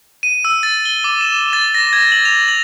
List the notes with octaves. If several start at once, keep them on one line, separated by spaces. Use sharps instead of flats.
D#7
E6
A6
G7
D6
E7
A6
A#6
G#6
F#7
F7
F#7